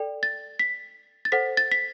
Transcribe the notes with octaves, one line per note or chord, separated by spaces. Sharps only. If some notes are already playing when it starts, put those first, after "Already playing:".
Already playing: A4 D5 G5
A6
B6
A6
A4 C5 F#5 B6
A6
B6